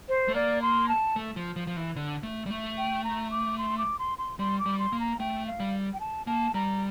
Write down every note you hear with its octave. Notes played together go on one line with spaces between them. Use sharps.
C5
A3
A#3 D5
C6
A5
A3
F3
F3
F3
E3
D3
A3
G3
A3
G5
A#5
D6
C6
D6
C6
C6
G3 C6
D6
G3
C6
A#3
A#5
A3 G5
F5
G3
G5
A5
A#3 A5
G3 A#5